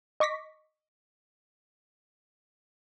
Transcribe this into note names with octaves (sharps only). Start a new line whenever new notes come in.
D#5 C#6 D6 A#6 B6